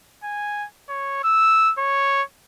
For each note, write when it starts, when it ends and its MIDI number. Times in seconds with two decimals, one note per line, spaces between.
0.24 0.66 80
0.89 1.24 73
1.24 1.73 88
1.78 2.22 73